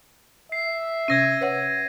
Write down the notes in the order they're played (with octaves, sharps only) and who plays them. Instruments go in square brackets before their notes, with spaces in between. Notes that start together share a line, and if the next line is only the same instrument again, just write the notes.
[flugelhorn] E5 [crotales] C7
[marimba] C3 C#4 [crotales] G#6 A#6 D#7
[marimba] B4 C#5 F#5